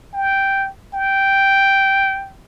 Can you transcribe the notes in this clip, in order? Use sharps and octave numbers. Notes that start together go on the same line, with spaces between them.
G5
G5